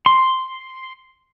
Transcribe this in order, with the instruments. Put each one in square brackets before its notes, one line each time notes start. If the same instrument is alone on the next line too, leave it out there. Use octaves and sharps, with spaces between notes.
[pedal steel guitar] C6